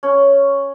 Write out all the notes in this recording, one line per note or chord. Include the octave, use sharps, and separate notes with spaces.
C#4